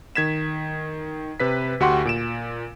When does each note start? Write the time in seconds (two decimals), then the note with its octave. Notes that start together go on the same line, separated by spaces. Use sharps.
0.15 D#3 G#6 B6 E7
1.40 C3 B4 B6
1.80 D2 F#4 G4 F#5 C6 C#6
2.05 A#2 D7 E7